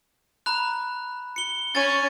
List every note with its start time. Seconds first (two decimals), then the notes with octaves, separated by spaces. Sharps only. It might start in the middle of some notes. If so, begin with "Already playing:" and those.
0.46 A#5 B5 F#6
1.36 C#7 G7
1.75 C#4 A6 D#7